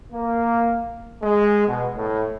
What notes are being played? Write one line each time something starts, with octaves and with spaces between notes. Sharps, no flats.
A#3
G#3
B2
A2